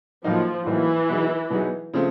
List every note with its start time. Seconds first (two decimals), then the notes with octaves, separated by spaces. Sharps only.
0.24 A2 F3 F#3 A#3 D#4
0.66 A2 E3 F#3 A#3 D#4
1.09 B2 F#3 B3 D#4 G#4
1.50 B2 F#3 B3 D#4 G#4
1.94 C#3 F3 A3 C4